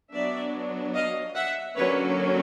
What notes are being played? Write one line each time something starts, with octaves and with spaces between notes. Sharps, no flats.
F#3 B3 D4 D5 E5
D#5 F5
E5 F#5
D3 F#3 A#3 C#4 B4 C#5